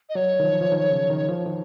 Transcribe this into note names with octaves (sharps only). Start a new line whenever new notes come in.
D#5
F#3 C#5
D#3
F3
F3
D#3
C#3
D#3
F3
D#3